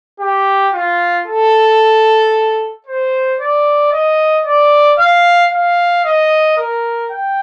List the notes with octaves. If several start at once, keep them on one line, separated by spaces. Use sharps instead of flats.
G4
F4
A4
C5
D5
D#5
D5
F5
F5
D#5
A#4
G5